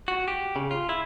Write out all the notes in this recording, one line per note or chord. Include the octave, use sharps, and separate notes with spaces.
F#4
G4
C#3
F4
E4